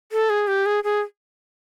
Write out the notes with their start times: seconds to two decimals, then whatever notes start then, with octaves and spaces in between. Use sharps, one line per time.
0.12 A4
0.30 G#4
0.47 G4
0.66 G#4
0.84 G#4